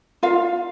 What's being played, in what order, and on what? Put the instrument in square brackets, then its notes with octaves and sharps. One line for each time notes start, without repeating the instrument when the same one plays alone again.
[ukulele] F4 F5